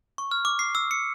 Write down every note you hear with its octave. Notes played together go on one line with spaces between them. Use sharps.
C#6
F6
D6
C7
E6
C#7